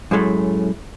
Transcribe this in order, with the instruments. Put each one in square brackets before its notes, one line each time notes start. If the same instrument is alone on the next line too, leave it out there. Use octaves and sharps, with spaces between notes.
[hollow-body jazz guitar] F#2 A2 G#3 A3